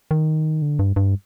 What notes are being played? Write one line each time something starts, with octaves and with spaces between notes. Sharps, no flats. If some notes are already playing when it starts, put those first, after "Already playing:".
D#3
D3
G2
G2